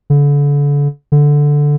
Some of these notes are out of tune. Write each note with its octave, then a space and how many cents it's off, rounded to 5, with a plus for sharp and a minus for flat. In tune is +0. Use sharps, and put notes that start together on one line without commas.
D3 -35
D3 -5